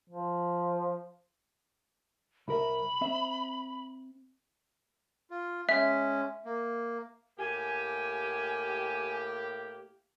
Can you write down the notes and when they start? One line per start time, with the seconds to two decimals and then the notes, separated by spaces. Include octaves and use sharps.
0.10 F3
2.48 C2 A#4 E5 B5
3.01 C4 E5
5.31 F4
5.69 G#3 C#4 E5
6.45 A#3
7.39 A2 A#3 G4 G#5